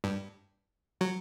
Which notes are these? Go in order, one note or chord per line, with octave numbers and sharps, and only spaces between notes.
G2
F#3